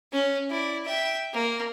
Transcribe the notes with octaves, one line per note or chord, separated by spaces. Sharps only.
C#4
E4 D5
E5 G5
A#3